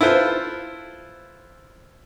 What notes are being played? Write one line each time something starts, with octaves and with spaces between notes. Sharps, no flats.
E4 F4 A4 B4 C5